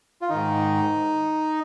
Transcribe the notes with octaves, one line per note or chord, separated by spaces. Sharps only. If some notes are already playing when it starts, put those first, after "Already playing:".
F4
G#2 D#3 D#4